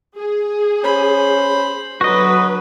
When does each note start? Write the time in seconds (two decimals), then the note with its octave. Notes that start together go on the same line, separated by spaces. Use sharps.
0.17 G#4
0.84 C#4 C5 B5
2.01 D3 F#3 B3 F#4 B4 D#5